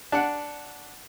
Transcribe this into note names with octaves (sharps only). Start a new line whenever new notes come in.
D4 F#5